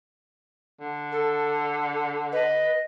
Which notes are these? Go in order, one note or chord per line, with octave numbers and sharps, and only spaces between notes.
D3
A4
B4 D#5